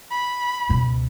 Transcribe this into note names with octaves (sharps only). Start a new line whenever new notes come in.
B5
C#2 B2